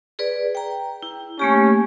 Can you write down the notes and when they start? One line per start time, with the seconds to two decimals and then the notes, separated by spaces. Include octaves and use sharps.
0.19 G#4 B4 D5
0.55 G5 A#5
1.03 E4
1.39 A3 A#3 C#4 G4